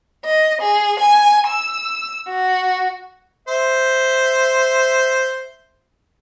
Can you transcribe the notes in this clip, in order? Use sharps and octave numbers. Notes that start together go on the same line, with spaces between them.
D#5
G#4
G#5
E6
F#4
C5 E5